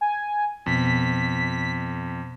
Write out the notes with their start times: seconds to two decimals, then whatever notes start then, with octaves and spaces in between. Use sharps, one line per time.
0.01 G#5
0.66 F2 B2 B3 B6